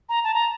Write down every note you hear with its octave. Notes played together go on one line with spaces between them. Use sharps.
A#5
A5
A#5